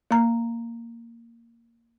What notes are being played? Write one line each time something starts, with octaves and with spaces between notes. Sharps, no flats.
A#3 A#5